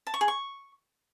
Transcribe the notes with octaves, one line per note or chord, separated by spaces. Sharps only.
A5
C#6
G#4
C#6